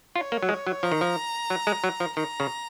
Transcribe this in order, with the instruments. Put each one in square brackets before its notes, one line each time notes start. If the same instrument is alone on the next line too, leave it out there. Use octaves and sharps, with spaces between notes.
[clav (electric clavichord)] F4 [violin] C#5
[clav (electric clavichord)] A#3
F#3
G#3
F#3
[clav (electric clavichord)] F3 [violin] A#5
[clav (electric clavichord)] D#3
F3
F#3
G#3
F#3
F3
[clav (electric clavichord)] D#3 [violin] A#5
[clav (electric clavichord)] C#3